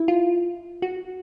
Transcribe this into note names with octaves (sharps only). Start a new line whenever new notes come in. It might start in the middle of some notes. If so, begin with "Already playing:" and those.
Already playing: E4
F4
F#4